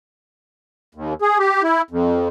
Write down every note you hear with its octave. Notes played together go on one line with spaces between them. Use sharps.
D#2
G#4
G4
E4
F2